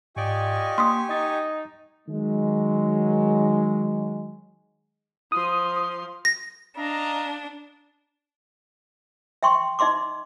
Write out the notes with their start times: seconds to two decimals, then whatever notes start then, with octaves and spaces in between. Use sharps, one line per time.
0.16 G#2 F4 G4 D5 D#5 G#5 C#6
0.78 A#3 C6 D#6 B6
1.09 D#4 D#5 A6
2.09 D#3 F#3 G#3
5.32 F3 C6 D#6
6.25 A#6
6.77 D4 D#5 F5 A#5
9.43 E5 G5 C6 C#6
9.79 D#4 D#5 E5 C6 D6